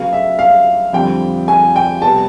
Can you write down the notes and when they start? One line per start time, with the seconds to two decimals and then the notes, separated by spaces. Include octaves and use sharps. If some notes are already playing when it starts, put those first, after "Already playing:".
Already playing: D2 C#3 F#3 B3 F5
0.13 E5
0.39 F5
0.93 F2 D3 G3 C4 G5
1.48 G#5
1.76 G5
2.02 C2 B2 G3 B3 A5